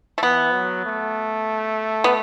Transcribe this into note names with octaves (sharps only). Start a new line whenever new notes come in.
A3
E3 B3
F#3
A3
B3